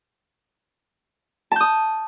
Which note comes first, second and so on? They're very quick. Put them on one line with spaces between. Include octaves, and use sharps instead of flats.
A5 G6 D#6